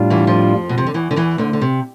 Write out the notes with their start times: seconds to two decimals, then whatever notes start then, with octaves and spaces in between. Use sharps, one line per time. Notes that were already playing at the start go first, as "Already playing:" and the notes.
Already playing: A2 G3 D4 F4
0.10 E2 E3
0.27 F2 F3
0.69 B2
0.78 C3
0.87 D3
0.94 E2 E3
1.11 D3
1.16 E2 E3
1.38 D2 D3
1.53 D3
1.61 C3